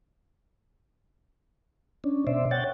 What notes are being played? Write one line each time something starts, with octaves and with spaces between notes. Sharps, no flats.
C#4 D4
B2 C5 D5 E5
C#5 F#5 G5 A6